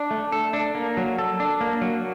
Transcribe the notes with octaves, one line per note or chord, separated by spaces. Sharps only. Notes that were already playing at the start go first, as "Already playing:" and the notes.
Already playing: D4
A3
A4
D4
A#3
F#3
A4
D4
A#3
F#3